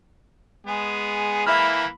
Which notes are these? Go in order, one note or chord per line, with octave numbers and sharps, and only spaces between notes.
G#3 B3 G#4
E3 A#3 E4 E5 B5 F6